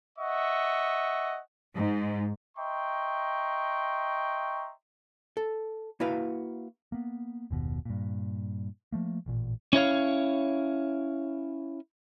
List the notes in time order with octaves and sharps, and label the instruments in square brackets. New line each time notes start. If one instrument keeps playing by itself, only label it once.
[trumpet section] D#5 E5 F#5 C#6
[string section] G#2
[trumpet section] D#5 E5 G5 A#5 C6 C#6
[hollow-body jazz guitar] A4
A#3 E4 F#4 B4 F5
[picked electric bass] A#3 B3
F#1 D#2 B2
G2 A#2
F3 A3 A#3
A1 A#2
[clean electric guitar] C#4 E4 C#5 F5